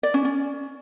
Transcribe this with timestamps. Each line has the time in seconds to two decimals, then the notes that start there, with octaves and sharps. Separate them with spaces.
0.03 D5
0.14 C#4
0.25 C#4